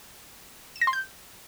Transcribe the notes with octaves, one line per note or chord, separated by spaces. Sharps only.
E7
A#6
C6
G6